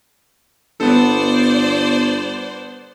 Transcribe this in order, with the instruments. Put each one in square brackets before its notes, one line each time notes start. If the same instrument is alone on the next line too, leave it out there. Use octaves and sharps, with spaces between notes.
[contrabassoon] G1 [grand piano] B3 A4 [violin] C5 D5